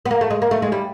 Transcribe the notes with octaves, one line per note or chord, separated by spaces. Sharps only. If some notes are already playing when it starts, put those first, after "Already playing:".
B3
A#3
A3
G#3
A#3
A3
G#3
G3